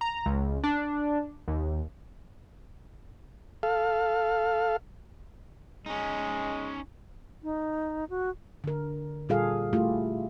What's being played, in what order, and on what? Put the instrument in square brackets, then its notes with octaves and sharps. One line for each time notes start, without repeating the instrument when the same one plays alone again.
[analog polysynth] A#5
C#2
D4
D#2
[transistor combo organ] A4 F5
[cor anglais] G#3 [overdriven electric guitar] C#4 D#4
[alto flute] D#4
F#4
[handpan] D3 A#4
A#2 G3 F4 G#4 A4 F5
A3 E4 F4 G4